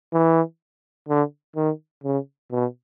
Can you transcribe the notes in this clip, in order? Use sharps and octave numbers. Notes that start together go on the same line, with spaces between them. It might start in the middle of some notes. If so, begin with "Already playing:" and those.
E3
D3
D#3
C#3
B2